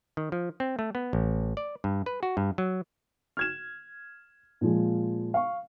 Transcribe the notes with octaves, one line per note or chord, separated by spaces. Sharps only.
D#3
F3
C4
A3
B3
A1
D5
G2
B4
F#4
G2
F#3
F6 G#6 E7
A#2 F3 G#3
F5 C#6